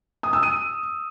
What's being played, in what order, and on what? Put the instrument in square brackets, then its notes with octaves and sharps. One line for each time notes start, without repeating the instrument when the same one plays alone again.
[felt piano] D#6
E6
D#7